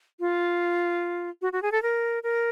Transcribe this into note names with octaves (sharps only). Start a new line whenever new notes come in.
F4
F#4
F#4
G#4
A4
A#4
A#4